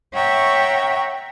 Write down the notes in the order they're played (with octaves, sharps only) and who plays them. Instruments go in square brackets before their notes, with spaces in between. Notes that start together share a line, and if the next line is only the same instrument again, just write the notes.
[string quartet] C#5 E5 F#5 G5 A#5 C#6